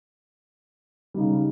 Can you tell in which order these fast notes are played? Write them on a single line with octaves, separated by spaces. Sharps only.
G3 D#4 C#3